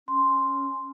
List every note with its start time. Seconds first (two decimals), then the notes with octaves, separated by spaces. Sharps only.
0.08 C#4 C6